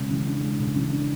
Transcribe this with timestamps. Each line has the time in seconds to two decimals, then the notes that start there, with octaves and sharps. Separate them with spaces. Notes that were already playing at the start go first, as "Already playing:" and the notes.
Already playing: C#3 G#3
0.10 E3
0.27 D4
0.43 G#3
0.60 C#3
0.76 E3
0.92 D4